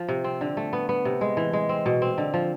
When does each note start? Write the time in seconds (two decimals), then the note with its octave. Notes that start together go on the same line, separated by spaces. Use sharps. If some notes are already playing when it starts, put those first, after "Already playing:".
Already playing: F3
0.08 C3
0.24 C4
0.41 D3
0.57 A3
0.73 B3
0.89 B3
1.05 C3
1.21 G#3
1.37 E3
1.53 G#3
1.69 C4
1.86 B2
2.02 C4
2.18 D3
2.34 F3